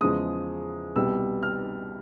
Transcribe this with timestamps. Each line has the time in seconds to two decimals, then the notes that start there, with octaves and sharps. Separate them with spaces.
0.01 E2 C#3 F3 G#3 D#6
0.96 C2 B2 G3 E6
1.43 F6